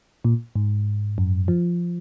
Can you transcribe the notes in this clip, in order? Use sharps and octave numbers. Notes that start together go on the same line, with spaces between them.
A#2
G#2
F#2
F3